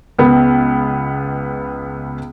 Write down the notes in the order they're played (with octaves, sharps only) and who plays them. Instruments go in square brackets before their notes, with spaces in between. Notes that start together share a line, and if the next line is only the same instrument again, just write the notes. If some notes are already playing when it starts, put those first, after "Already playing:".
[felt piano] C#2 B3